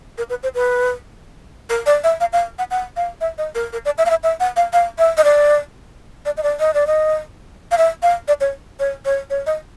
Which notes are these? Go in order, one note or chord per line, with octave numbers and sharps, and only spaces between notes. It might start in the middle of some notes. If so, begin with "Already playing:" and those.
A#4
B4
C5
B4
A#4
D5
E5
F5
F5
F#5
F#5
F5
E5
D#5
A#4
A#4
D5
E5
F5
E5
E5
F#5
F5
F5
E5
D#5
D5
D5
D#5
D5
D#5
D5
D#5
F5
E5
F5
D5
C#5
C#5
C#5
C#5
D#5